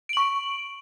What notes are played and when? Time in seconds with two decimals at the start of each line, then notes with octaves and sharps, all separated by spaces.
0.09 D7
0.13 F#7
0.17 C#6